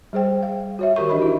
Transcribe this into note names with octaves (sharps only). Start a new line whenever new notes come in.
G3 G#4 C5 G5
F5
F#4 C#5 E5
D#3 F#4 G4 A#4 C#6
E3 D4 D#5 B5
D#4 E4